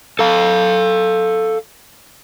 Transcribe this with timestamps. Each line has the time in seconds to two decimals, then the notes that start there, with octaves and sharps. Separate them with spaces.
0.19 A4 F5